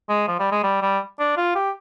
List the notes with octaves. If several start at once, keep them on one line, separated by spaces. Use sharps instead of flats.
G#3
F3
G3
G#3
G3
G3
D4
F4
G4